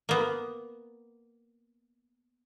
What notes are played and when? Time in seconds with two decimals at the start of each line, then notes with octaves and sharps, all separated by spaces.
0.09 A#3 B3